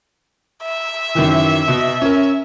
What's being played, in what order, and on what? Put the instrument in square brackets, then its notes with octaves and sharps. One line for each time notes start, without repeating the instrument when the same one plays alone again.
[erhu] E5
[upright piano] F#2 D#3 E3
B2
C#4 A#4